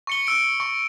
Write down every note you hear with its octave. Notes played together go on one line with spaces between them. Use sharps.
C#6 C#7 G7
E6 D7
C#6